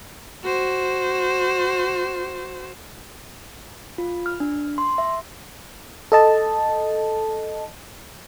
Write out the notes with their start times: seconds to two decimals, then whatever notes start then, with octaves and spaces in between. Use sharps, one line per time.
0.44 F#4 C5
3.98 F4
4.26 F6
4.40 D4
4.78 C6
4.98 E5
6.12 A4 D#5 A5